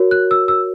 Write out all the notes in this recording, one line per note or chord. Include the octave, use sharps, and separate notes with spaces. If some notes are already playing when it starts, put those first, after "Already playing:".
Already playing: F#4 A#4 C#5
F#6
E6
E6